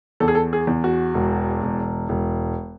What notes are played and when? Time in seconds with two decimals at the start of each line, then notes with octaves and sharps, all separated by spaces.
0.20 E2 A4
0.28 G#4
0.35 A4
0.53 G#4
0.67 E2
0.84 F#4
1.14 E1
1.63 E1
2.09 E1